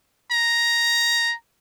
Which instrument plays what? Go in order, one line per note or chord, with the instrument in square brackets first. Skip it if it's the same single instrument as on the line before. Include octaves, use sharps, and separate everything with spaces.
[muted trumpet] A#5